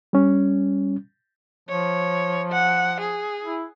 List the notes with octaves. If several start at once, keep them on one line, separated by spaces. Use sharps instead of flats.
G3 C#4
F3 C#5
F#5
G#4
E4